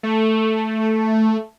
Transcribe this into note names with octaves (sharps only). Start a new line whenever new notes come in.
A3